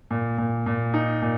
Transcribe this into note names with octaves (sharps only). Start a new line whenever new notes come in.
A#2
A#2
A#2
D#4
A#2